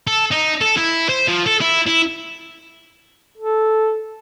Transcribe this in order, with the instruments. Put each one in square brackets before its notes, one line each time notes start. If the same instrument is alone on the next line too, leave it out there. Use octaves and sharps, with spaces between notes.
[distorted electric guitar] A4
D#4
A4
E4
C5
F3
A4
E4
E4
[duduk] A4